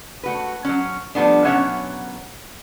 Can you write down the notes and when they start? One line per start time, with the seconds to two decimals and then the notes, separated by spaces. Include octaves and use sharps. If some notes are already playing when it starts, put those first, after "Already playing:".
0.23 A3 F#4 B4
0.65 F#3 C#4
1.15 F3 G3 A3 B3 D4
1.45 B2 F#3 C#4 C#5 E5 F#5